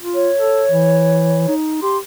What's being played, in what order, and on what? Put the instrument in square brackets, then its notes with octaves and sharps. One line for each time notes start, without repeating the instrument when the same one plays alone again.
[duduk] F4
[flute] C#5
[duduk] A4
E3
D#4
[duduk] G4 [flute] C6